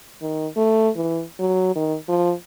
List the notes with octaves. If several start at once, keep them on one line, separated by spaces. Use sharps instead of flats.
D#3
A3
E3
F#3
D#3
F3